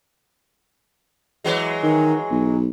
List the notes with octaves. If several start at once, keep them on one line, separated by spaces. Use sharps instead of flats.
E3 F#3 G#3
D#3
B1